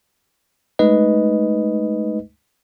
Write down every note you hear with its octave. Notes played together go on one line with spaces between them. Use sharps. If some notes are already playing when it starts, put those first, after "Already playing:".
G#3 A3 D#4 B4 D#5